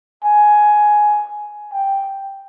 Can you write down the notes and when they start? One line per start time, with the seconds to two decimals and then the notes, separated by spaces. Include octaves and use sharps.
0.24 G#5
1.73 G5